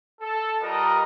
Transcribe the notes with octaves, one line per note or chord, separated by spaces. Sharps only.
A4
G3 F4 A#4 B4 D#5 A#5